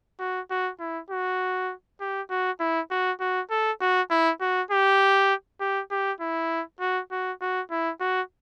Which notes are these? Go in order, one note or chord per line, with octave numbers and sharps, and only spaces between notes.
F#4
F#4
E4
F#4
G4
F#4
E4
F#4
F#4
A4
F#4
E4
F#4
G4
G4
G4
E4
F#4
F#4
F#4
E4
F#4